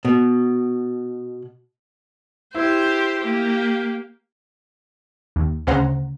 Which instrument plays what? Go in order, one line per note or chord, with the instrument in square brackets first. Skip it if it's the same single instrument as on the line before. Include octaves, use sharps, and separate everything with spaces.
[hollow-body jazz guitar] B2
[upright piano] E4 [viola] G4 C5
[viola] A#3 G4
[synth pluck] D#2
D2 C#3 C#4 C5 F#5 A#5